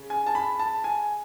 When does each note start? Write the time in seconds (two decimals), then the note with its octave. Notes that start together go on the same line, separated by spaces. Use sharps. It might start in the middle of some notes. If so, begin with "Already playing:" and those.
Already playing: C#3
0.10 G#5
0.26 A5
0.35 B5
0.59 A5
0.84 G#5